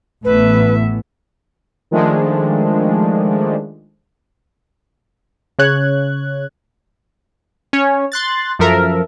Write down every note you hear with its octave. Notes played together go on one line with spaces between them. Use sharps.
A1 E3 A3 B3 B4 E5
D#3 F3 G#3 A3 D4
C#3 C#5 F#6 G#6
C#4 C#5
C6 F#6 A6
F#2 F3 A4 A#4 E5